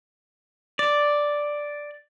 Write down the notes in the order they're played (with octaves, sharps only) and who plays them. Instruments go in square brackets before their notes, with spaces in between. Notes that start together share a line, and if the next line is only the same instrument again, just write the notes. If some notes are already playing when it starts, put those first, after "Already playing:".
[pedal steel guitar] D5